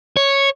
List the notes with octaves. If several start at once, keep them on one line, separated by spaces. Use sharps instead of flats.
C#5